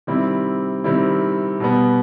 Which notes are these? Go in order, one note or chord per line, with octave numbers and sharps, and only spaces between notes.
C3 D#3 G3 C4 E4
C3 D#3 G3 C4 E4
B2 G3 B3